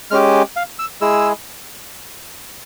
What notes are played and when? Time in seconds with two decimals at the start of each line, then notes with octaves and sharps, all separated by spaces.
0.11 G#3 C#4 G4 F6
0.56 F5
0.79 E6
1.01 G#3 E4 G#4 E6